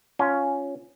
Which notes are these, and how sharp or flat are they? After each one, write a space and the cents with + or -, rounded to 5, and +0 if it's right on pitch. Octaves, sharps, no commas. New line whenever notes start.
C#4 +10 F4 +0